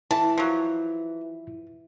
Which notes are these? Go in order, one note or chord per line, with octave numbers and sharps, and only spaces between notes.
E3 E4 A5
F3 F#3